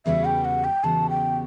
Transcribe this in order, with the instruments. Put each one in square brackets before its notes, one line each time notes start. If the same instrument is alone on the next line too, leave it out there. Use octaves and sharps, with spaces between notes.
[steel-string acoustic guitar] E2 C#3 G3 B3 F#4 [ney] E5
[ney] G5
F#5
G5
[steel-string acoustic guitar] E2 C#3 G3 B3 F#4 [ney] A5
[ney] G5